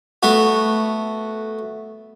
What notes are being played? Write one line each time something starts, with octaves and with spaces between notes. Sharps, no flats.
A3 B3 F#4